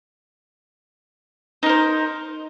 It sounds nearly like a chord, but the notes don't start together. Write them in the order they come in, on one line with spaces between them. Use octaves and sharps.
D#4 A#4 C5